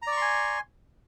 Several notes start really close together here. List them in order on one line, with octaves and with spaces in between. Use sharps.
A#5 D5 C#6 C6 G#5